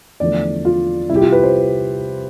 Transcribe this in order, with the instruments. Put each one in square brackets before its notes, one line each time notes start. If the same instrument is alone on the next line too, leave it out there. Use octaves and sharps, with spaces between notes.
[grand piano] E2 D3 F3 A3 D5
F4
C2 C3 G3 E4
G4
F4
B4
C5